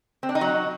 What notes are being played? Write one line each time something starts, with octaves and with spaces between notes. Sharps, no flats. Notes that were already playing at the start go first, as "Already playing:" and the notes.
C4
D4
D#4
F#3